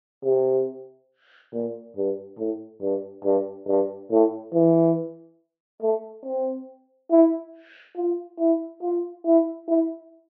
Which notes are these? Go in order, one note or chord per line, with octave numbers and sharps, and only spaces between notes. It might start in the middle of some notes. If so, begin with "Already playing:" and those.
C3
A#2
G2
A2
G2
G2
G2
A2
E3
A3
C4
E4
F4
E4
F4
E4
E4